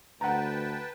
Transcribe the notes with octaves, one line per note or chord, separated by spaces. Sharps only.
D2 B4 F#5 G5 A5 A#5